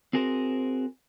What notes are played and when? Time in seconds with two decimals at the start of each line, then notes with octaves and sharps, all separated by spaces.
0.13 C4 F#4 G#4 A#4 C5